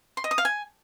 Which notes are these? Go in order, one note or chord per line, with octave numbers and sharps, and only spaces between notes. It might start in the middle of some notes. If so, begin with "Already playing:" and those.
C6
D#5
D#6
F5
G#5